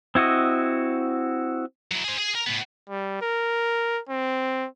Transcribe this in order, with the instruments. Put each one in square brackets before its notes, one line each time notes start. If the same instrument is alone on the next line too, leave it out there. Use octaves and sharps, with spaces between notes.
[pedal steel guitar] C4 E4 F#4 D#5
[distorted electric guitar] F#3 E4
G#4 C5
G#4 G#5
A#4
A2 B3
[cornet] G3
A#4
C4